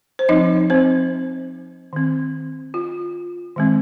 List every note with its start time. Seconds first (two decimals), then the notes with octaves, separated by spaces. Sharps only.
0.19 C5
0.29 F3 C4 D#4 D#5
0.70 C4 C5
1.93 D#3 C4
2.74 F4
3.56 D#3 G#3 C4